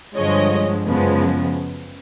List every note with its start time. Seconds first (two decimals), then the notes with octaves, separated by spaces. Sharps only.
0.16 G2 D3 F3 G#3 C#5 D#5
0.86 F#2 C#3 F3 G#3 B3